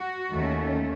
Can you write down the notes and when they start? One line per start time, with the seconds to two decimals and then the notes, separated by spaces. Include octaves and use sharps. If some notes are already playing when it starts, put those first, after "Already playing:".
Already playing: F#4
0.34 D#2 D#3 A3 C#4